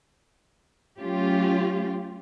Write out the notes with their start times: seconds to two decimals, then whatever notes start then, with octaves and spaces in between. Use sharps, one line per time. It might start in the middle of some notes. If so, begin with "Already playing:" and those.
0.99 F#3 A3 C#4 F4 G4